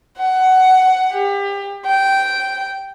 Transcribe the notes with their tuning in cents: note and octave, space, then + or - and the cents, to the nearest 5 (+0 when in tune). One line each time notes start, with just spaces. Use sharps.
F#5 +15
G4 +30
G5 -10